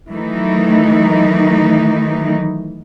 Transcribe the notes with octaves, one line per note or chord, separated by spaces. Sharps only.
D#3 E3 F#3 A3 D#4